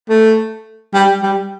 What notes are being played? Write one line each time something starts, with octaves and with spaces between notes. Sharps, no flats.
A3
G3
G3